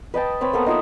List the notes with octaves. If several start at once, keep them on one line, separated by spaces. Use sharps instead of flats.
B4 D#5 G5 A5
C4 B4 C#5 B5
A#3 B3 A4 D#6
D#4 F4 B4 E5